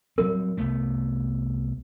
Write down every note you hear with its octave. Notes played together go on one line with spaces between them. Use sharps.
F#3 G3 C4 A#4
C2 A3 B3